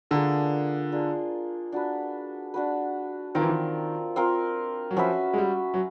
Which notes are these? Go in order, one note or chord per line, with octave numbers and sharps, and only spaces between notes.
D3 A#3 D4 F4 G#4
A#3 D4 F4 G#4
D4 F#4 B4
D4 F#4 B4
D#3 C4 F4 A#4
E3
D#3
C4 F4 A#4
F#3
F3 C#4 F#4 B4 E5
G#3
G3
F#3